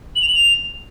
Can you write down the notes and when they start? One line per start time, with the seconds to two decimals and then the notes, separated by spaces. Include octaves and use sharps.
0.16 F#7
0.22 F7
0.28 F#7
0.35 F7